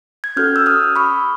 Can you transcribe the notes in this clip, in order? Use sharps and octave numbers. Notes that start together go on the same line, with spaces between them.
G#6
C#4 F#4 A4 F6 G6
E6
D#6 F6
B5 C#6